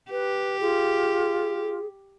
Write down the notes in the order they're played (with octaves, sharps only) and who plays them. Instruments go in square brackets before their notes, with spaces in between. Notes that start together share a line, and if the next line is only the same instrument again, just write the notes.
[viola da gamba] G4 [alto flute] B4
[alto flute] F4 [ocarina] G#4